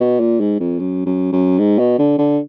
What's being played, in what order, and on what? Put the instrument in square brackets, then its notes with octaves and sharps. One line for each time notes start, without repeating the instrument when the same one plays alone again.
[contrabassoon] B2
A#2
G#2
F2
F#2
F#2
F#2
G#2
B2
D3
D3